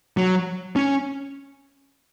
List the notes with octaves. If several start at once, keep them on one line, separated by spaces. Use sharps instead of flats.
F#3
C#4